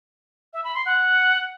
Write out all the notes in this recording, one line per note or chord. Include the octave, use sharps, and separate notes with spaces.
E5
B5
C6
F#5